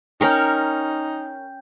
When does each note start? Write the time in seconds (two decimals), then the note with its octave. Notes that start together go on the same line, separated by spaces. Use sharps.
0.21 C#4 D#4 A#4 C#5 G5 G6